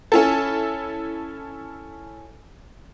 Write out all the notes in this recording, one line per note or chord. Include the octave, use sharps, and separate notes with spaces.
C#4 E4 A4